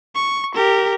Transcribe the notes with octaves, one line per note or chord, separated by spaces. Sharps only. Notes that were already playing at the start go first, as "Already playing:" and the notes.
C#6
G4 A#4